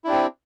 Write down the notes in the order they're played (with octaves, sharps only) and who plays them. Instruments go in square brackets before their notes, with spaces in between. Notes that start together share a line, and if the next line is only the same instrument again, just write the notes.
[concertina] E4
D4
G4
C4